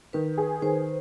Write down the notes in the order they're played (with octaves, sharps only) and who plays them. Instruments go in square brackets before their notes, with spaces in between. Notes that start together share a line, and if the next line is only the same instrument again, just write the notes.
[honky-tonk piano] D#3 [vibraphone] B4
[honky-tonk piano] G#4
[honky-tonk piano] D#3 [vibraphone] C5